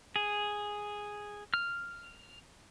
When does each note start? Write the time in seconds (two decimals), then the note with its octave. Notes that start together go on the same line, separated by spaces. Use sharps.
0.16 G#4
1.54 F6